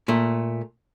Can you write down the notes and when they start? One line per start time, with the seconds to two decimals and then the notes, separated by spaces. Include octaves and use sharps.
0.08 A#2 A3